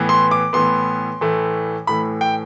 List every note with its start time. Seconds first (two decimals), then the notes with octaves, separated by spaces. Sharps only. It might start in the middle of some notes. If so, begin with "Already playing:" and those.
Already playing: A2 E3 B3
0.09 C6
0.31 D6
0.53 A2 E3 B3 C6
1.21 A2 E3 A3
1.87 A2 E3 A3 B5
2.21 G5